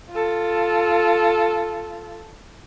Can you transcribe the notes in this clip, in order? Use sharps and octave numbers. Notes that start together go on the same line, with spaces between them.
F4 A4